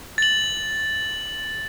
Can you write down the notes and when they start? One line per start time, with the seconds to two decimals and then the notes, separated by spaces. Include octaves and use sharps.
0.18 A6 F#7